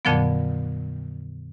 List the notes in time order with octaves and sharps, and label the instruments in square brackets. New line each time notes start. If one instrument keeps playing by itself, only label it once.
[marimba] F2 A#2 D3 F3 F#3 B3